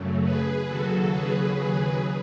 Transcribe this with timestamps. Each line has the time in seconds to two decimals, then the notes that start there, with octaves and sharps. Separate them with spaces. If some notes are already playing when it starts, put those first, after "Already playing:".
Already playing: F#2 C#3 F#3 A3
0.22 G#4 B4
0.66 D#2 C#3 F#3 F#4 A4
1.09 G#4 B4
1.53 G#4 B4